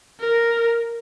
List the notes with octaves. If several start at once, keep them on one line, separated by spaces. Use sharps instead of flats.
A#4